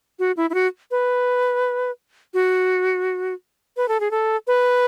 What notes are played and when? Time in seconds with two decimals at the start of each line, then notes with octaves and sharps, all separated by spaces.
0.19 F#4
0.37 E4
0.50 E4
0.54 F#4
0.91 B4
2.34 F#4
3.77 B4
3.88 A4
4.00 G#4
4.11 A4
4.47 B4